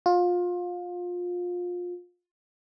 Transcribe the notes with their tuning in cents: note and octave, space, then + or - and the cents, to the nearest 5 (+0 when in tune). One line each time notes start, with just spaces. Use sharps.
F4 +25